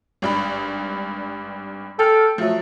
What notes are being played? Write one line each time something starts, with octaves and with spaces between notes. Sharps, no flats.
G#1 G2 B5
A4 G5 F6
F3 F#3 A3